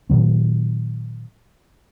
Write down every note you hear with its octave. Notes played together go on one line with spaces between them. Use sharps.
A#2 D#3 F#3 C4